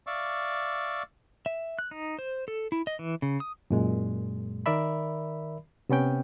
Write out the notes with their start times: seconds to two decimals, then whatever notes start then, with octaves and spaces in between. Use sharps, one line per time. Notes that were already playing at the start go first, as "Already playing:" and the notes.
0.07 D5 E5 F5 C#6 D6 E6
1.46 E5
1.79 F#6
1.91 D#4
2.19 C5
2.48 A4
2.72 E4
2.87 D#5
2.99 E3
3.22 C#3
3.40 D#6
3.70 F#2 A#2 G#3
4.66 D#3 A#4 D5 E5 B5
5.89 C3 B3 C#4 G5